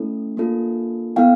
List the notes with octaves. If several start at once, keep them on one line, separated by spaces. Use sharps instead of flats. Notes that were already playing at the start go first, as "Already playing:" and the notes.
Already playing: A3 C#4 E4 A4
A#3 D4 F4 A4
B3 E4 A4 F5 G5